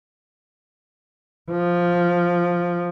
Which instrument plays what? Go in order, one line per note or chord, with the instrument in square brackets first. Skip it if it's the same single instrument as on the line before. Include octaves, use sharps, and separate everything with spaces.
[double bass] F3